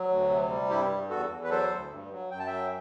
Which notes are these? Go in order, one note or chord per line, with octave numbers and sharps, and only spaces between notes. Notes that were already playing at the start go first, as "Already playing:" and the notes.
Already playing: F#3
D2
C3
G3
G2 E4 G4
G2
E2 F#4 A4
E2
B4
F#3 A4 C5
D2
G2
F#3
F#2 G5
A5
F#3 E5 G5